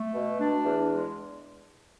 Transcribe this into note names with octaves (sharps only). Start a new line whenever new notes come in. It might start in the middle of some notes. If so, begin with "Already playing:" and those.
Already playing: A3
B2
D4
E2
G#3